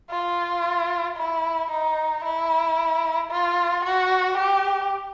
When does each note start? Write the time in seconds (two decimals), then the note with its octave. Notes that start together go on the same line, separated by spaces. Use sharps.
0.10 F4
1.17 E4
1.71 D#4
2.24 E4
3.31 F4
3.85 F#4
4.38 G4